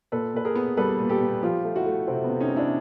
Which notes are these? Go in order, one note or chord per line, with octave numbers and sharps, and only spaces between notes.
A#2 A4 B4
A#2 B4
G#4 A#4
B3
G3 A4 B4
A#2
G4 A4
A#2
F3 F4 G4
A3
E4 F#4
A3
C3 C4
B3
C3
C#4 D#4
A3
D4 E4